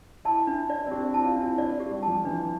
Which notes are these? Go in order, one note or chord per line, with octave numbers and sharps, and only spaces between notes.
E4 A5
D4
D5
C4
D4 G4
E4
A5
F4
D4
E4
D4 D5
G4
G3
A5
F3
E3 D4